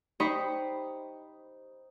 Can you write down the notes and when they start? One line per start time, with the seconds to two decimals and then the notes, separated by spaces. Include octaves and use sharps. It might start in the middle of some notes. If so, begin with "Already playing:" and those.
0.20 D#4 G4 C5 D#5 B5 C#6